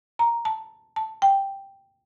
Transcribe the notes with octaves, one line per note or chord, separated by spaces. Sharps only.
A#5
A5
A5
G5